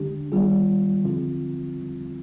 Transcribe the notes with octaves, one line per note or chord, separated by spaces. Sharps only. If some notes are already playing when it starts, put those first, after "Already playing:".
Already playing: D3 G#3 D4 G4
D#3 G3 B3 F4 G#4
D3 F3 C4 F4